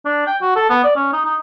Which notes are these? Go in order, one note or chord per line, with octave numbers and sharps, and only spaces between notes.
D4
G5
F#4
A4
B3
D5
C#4
D#4
D#4